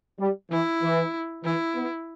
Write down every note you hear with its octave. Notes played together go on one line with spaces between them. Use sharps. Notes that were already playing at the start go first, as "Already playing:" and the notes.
G3
E3 E4
E3
E3 E4
B3